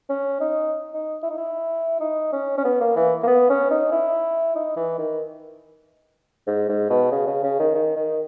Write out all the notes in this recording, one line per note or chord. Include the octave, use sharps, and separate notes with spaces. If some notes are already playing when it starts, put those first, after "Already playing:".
C#4
D#4
D#4
E4
D#4
E4
D#4
C#4
C#4
B3
A#3
E3
A#3
B3
C#4
D#4
E4
D#4
E3
D#3
G#2
G#2
B2
C#3
C#3
C#3
D#3
D#3
D#3